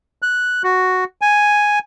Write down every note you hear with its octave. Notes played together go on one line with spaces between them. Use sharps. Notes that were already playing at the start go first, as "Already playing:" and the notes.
F#6
F#4
G#5